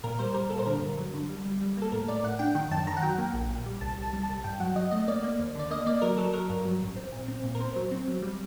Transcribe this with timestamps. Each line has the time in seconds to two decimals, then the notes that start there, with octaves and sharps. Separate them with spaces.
0.04 A#2 A#4
0.19 G3 C5
0.34 G3 A#4
0.50 A#2 A4
0.59 C5
0.66 D3 A#4
0.82 G2
0.97 F#3
1.14 D3
1.29 G3
1.45 G3
1.61 G3
1.77 A#3 A4
1.92 A2 A#4
2.08 A2 D5
2.24 A2 F#5
2.39 D4 G5
2.55 D#3 G5
2.71 F#2 A5
2.87 D#3 A#5
2.97 F#5
3.02 F#3 G5
3.18 A#3
3.34 A#1
3.50 A#2
3.66 G3
3.81 C2 A5
3.98 C2 A5
4.13 G3
4.23 A5
4.29 C2
4.44 G2 G5
4.60 F#3 F#5
4.76 F#3 D#5
4.91 A3 D#5
5.08 A#3 D5
5.24 A#3
5.39 D#2
5.55 D3 D5
5.70 A#3 D#5
5.86 A#3 D5
6.02 F#3 A#4
6.17 F#3 A4
6.33 F#3 A#4
6.50 G2
6.65 F#3
6.82 A1
6.96 C4
7.12 A#2
7.28 C4
7.44 A#2
7.55 A#4
7.60 C4 C5
7.76 F#3
7.91 C4
8.08 F#3
8.22 G3